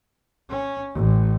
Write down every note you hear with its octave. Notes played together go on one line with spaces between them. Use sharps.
C#4
A1